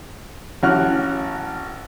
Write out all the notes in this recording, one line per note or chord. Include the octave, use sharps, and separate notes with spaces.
A1 C#4 F#4 F6 F#6